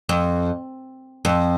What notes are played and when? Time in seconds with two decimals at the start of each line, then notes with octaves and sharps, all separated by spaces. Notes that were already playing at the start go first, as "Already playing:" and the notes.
0.09 F2
1.25 F2